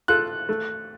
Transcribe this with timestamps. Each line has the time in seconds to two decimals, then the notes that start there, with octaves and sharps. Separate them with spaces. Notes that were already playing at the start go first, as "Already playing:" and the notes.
0.08 F4 A4 F#6
0.49 A3